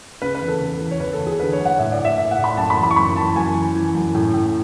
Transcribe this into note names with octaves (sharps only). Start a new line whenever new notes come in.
C#3 B4
B4
E2
A4
E2
E3
C#5
E2 B4
A4
E2
G#4
D3 B4
C#5
F#3
F#5
A2 E5
D5
A2
E5
A2 E5
F#5
A2
B5
F#2 A5
B5
E3
B5
C#6
F#2 B5
E3 A5
F#2 G#5
E3
E3
F#2
A2
A2